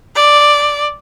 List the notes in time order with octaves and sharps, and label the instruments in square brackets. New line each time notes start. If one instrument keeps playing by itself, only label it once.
[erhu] D5